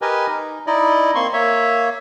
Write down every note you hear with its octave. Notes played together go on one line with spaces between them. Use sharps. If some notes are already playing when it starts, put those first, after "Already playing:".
G4 A#4 B4 D#5 G#5
D#4
D#4 E4 D5 D#5
A#3 C4 C6 C#6
A#3 C#5 E5